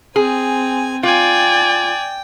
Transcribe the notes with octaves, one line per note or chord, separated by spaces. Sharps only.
C4 G#4 G#5
F4 D5 G5 G#5